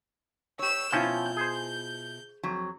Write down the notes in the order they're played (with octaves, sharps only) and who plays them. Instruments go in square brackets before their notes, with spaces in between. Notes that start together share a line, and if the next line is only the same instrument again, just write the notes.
[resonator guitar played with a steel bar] G4 C#5 [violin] E6 E7
[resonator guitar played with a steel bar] B2 E4 F4 [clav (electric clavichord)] F3 C4 C#4 [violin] G6
[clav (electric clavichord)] G#4 C5
[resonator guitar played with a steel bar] F2 F#3